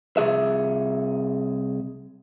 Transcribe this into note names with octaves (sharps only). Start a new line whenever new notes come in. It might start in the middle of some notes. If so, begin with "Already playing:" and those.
C2 G#4 E5